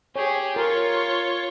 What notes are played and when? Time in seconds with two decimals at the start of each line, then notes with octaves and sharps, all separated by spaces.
0.16 G4 G#4 C#5
0.56 F4 A#4 C#5